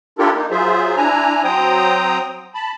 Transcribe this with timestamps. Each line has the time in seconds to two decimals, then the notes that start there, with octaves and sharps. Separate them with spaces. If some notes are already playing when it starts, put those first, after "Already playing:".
0.18 D4 E4 F4 G4 A4 A#4
0.34 A#3 D#4
0.51 F#3 F4 G#4 C5 E5
0.96 D4 E4 G#5 A#5
1.44 F#3 C4 C5 G5 A#5 D#6
2.54 A5 B5